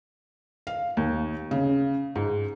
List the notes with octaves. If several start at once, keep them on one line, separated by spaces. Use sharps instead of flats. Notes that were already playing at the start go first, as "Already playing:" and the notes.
F5
D#2
C#3
G#2